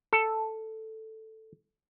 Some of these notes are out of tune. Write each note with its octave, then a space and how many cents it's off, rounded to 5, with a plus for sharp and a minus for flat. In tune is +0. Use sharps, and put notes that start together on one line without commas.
A4 +5